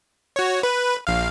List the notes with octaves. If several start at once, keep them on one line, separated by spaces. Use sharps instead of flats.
F#4 C#5
B4
A#1 F5